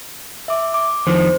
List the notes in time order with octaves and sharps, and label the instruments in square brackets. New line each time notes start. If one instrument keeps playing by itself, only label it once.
[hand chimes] E5 D6
D6
[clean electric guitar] F2 D#3 F3 [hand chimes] C5